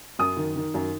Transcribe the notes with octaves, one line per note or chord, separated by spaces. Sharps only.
F#2 D#6
D#3
D#3
F#2